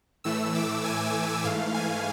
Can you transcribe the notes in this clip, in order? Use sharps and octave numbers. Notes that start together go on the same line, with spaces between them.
A2 E3 A3 E6
D6
G#5
G#2 E3 A3 F5
G#5